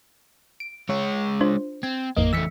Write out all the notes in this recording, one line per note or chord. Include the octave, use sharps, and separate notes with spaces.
D7
G#3 C#5
D4 F4 C5
C4 G#6
A1 F2 A#3 D#5
E2 A3 E6 B6 C#7